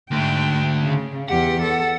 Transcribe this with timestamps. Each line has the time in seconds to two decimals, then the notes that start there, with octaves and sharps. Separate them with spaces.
0.11 D2 G#2 D3 G5
0.83 C#3
1.28 E2 G4 F#5
1.62 A4